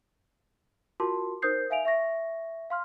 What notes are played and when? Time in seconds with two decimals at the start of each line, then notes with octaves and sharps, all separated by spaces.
1.00 F4 F#4 A#4 A5 C6 D6
1.42 D#4 A#4 C5 D#6 G6 C7
1.70 E5 F5 G#5 D7 F7
1.85 E5 C#6 A#6
2.70 F5 C6 F6